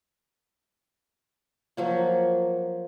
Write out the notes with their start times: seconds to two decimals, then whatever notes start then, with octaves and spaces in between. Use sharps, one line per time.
1.77 F3 F#3 A#3